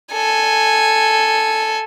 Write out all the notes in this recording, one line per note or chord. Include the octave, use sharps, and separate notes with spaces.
A4 G#5